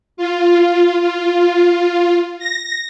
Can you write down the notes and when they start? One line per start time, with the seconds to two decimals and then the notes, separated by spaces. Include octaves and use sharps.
0.17 F4
1.00 F4
2.39 A#6